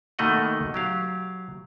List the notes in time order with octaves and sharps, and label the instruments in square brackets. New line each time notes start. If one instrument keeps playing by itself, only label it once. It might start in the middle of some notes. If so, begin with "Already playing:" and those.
[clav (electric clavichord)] B2 D#3 A3 A#3 D#5 F#5
F#3 G4 F5